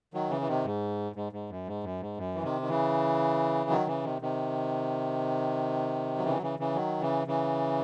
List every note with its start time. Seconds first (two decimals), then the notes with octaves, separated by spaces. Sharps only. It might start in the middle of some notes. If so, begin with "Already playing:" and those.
0.14 D#3 F#3
0.30 C#3 E3
0.41 E3
0.47 C3 D#3
0.64 G#2
1.16 G#2
1.32 G#2
1.50 F#2
1.67 G#2
1.83 F#2
2.01 G#2
2.17 F#2
2.35 E3
2.43 C3 D#3
2.61 D#3
2.68 C#3 E3
3.70 D#3 F#3
3.87 C#3 E3
4.04 C3 D#3
4.22 C3 D#3
6.18 F#3
6.25 C#3 E3
6.37 F#3
6.42 C#3 E3
6.59 C#3 E3
6.75 D#3 F#3
7.01 C#3 E3
7.27 C#3 E3